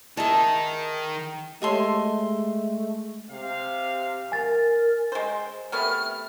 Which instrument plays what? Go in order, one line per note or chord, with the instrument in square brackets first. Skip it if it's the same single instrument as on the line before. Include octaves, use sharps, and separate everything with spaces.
[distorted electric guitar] D#3 [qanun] G#4 E5 A5
[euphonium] G#3 [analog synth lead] A3 [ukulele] G4 A4 C#5 [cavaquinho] D#5 E5 C6
[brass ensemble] C3 F5
[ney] A#4 [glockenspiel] G#5 A6
[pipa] G#3 C5
[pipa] C3 A3 B3 [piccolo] F6